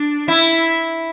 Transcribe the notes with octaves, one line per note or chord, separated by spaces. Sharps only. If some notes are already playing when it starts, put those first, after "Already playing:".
Already playing: D4
E4